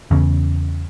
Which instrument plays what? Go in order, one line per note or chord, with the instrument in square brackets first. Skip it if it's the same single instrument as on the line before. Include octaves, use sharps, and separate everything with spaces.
[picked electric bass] E2 C#3